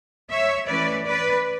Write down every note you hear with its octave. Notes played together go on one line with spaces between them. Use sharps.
C#5 E5
E3 A3 C#4 B4 D5
B4 D5